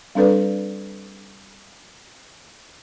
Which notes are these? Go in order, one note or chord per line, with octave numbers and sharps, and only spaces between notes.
G3 C4 D4 A4 B4 D5